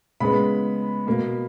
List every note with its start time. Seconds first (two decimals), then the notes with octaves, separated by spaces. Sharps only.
0.20 C#3 G#3 B3 B5
1.06 B2 A#3